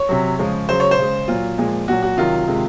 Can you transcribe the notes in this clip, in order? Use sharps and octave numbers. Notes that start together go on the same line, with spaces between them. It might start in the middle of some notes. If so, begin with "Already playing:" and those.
Already playing: C#5
C3 F#3
C#3 F3 G#3
C#3 F#3 C5
C#5
C5
C#3 G#3
A#2 F#3 F4
A#2 F3 G#3
A#2 F#3 F#4
F#4
C3 D#3 F#3 F4
C3 D#3 G#3